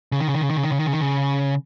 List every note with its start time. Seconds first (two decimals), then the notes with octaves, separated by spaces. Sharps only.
0.12 C#3
0.21 D#3
0.28 C#3
0.34 D#3
0.41 C#3
0.50 D#3
0.57 C#3
0.63 D#3
0.71 C#3
0.79 D#3
0.86 C#3
0.93 D#3
1.01 C#3